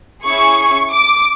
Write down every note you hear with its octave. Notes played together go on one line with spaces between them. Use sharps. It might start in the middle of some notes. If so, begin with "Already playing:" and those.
C#4 E4 G#4 C#6
D6